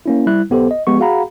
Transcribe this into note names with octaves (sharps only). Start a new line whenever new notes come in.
A#3 C#4 E4
G3 E4 F#6
B1 B3 G4 A4 C5
D#5
F3 G#3 B3 G4 C#6
F#4 G#4 F5 F#5 A#5 B5